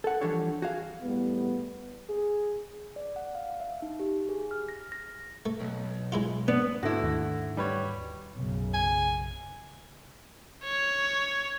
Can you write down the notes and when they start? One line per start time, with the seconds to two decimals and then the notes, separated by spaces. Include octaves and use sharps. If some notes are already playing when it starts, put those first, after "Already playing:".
0.04 A4 F#5
0.21 E3 F3 G3 D4 A4 C#5
0.62 F#4 G#4 F5
1.02 E2 A2 G3 B3
2.09 G#4
2.96 D5
3.16 F#5
3.35 F5
3.60 E5
3.82 D#4
4.00 G4
4.29 G#4
4.51 F6
4.69 A#6
4.92 A#6
5.46 A3
5.60 B1
6.12 G#3 E4 F4
6.48 B3 D4
6.83 G#2 D3 A3 E4 F#4
7.03 D#2
7.57 G3 B4 C#5
8.33 B1 F#2 C#3
8.74 G#5
10.63 C#5